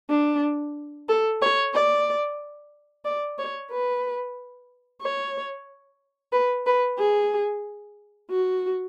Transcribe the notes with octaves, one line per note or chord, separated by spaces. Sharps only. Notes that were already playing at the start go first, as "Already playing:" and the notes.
D4
A4
C#5
D5
D5
C#5
B4
C#5
B4
B4
G#4
F#4